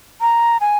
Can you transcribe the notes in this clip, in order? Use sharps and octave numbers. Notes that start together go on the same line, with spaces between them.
A#5
G#5